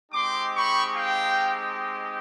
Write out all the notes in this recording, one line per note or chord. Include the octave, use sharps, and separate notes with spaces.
G#3 C4 D#4 G4 C6 D6
B5 C#6
F5 G5